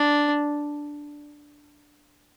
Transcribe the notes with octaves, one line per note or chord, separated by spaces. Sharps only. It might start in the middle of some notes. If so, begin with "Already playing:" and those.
Already playing: D4